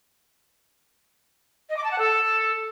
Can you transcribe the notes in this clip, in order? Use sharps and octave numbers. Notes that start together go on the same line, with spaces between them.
D#5
D6
A5
F#5
A4